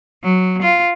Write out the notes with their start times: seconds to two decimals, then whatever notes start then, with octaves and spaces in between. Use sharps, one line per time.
0.23 F#3
0.62 F4